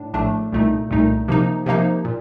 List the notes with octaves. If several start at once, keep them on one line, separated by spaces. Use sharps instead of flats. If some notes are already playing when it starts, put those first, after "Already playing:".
Already playing: A2 D4
A#1 A2 A3 D4
C2 A#2 A3 D#4
C2 A#2 A3 D#4
C3 F3 A#3 D#4
C3 F3 A#3 D#4
A#2